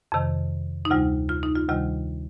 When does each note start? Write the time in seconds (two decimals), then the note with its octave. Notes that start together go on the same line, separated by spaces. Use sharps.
0.12 F2 C3 D#3
0.85 D#4
0.91 D2 C3 G3 F4
1.29 F4
1.43 D#4
1.56 F4
1.68 D2 C3 D#3 G3 F4